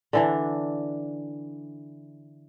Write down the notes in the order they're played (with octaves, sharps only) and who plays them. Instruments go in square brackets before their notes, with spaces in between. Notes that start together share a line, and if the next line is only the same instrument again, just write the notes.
[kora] D3 E3 D4